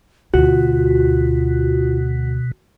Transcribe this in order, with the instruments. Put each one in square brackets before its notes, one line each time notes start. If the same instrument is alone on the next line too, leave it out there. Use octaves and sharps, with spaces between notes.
[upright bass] D2 [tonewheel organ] B2 [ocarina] F4 [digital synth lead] F#4